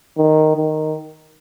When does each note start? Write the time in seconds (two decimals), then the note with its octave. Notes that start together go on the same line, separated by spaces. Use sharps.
0.18 D#3
0.56 D#3